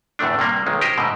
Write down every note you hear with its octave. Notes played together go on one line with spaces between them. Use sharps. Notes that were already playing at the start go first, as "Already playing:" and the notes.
E2 A2 D3 A3 D4
C3 G3 A#3
B1 D#3 G#3
G4 A#4 C5 D#5
G#2 B2 D3